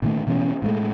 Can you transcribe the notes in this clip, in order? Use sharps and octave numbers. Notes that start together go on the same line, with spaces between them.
A#2 D#3 A3
B2 E3 B3 C#4
A2 G#3 A3